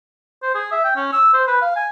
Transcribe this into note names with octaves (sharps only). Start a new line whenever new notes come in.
C5
G#4
E5
G5
C#4
E6
C5
B4
F5
G#5